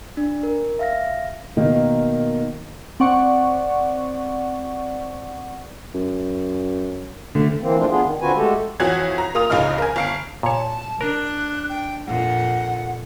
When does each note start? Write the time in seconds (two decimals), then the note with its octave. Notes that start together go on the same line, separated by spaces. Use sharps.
0.17 D4
0.43 A#4
0.79 E5 F5 A#6
1.56 B2 D#3 A#3
3.00 C4 D5 F#5 C#6
5.95 F#2
7.35 D3 A3
7.60 E3 A#3 C4
7.77 F3 A3 C4 D4 F4
7.90 B3 D4 F4 G#4
8.02 D#3
8.21 D3 C4 F4 F#4 B4 G#5
8.35 G#3 A3 F#4 G4 A4
8.80 F2 E3 F#4 C#5 F#6 G#6
9.18 A#5
9.35 A#3 F4 D#6 F7
9.50 F1 C#2 C#3 D#4 F6
9.78 A#4 G#5
9.96 G1 F5 D7
10.43 A#2 C#5 A5
11.01 D4 A#4 F#6
11.69 G5
12.07 F2 A#2 F#5